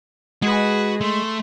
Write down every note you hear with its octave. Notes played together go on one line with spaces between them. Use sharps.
G#3 F#4 G#4 B4
A3 C6